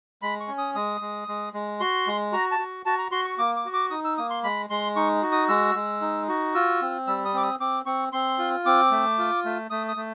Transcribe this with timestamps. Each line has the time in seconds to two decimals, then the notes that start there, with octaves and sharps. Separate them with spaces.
0.22 G#3 B5
0.40 C#6
0.48 C#4
0.58 D#6
0.75 G#3 D#6
1.01 G#3
1.28 G#3
1.54 G#3
1.80 F#4 C6
2.07 G#3
2.33 F#4 A#5
2.51 A5
2.59 F#4
2.85 F#4 A5
2.98 A#5
3.12 F#4 C6
3.25 C#6
3.38 A#3 D6
3.56 D6
3.65 F#4
3.73 D6
3.91 D#4 D#6
4.04 E6
4.17 A#3 D#6
4.30 C6
4.44 G#3 B5
4.70 G#3 C6
4.96 D#4 C#6
5.22 F#4
5.32 D#6
5.49 G#3 E6
5.75 G#3
6.01 D#4
6.29 F#4
6.55 F4 E6
6.81 C4
7.07 G3 E6
7.25 D#6
7.34 C4 D6
7.43 D#6
7.60 C4 D6
7.86 C4 C#6
8.13 C4 C6
8.38 F4
8.65 C4 D6
8.91 A3
9.19 F4
9.45 A3
9.70 A3 D#6
9.88 D#6
9.96 A3